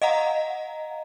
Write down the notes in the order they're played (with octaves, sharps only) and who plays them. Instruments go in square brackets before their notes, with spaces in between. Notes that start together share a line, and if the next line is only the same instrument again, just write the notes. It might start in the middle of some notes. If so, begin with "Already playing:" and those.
[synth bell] D#5 F5 F#5 A#5